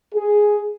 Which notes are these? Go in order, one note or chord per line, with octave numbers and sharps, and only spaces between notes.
G#4